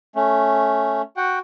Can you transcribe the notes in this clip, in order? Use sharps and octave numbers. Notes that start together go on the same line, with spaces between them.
A3 C#4
F#4 F#5 G5